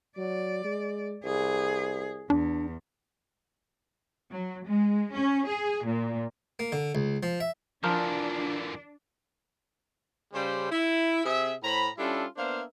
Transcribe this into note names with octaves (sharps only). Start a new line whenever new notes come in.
F#3 D5
G#3
C2 G#4
E2 D4
F#3
G#3
C#4
G#4
A#2
A#3
D3
C#2
F3
E5
D3 E3 F3 D4 F4 A#4
C#3 G3 C5
E4
C3 G#4 E5
A2 C5 A#5 B5
G3 C#4 D4 E4 F4 A4
A#3 B3 D4 C5 E5 F5